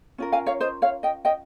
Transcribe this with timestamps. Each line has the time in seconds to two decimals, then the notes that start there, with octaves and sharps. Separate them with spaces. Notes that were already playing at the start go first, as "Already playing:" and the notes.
0.18 C#4 F4 A#4
0.32 F5 G#5
0.46 C#5 F5
0.61 C5 D#5
0.82 C#5 F5
1.03 D#5 G5
1.25 D#5 G5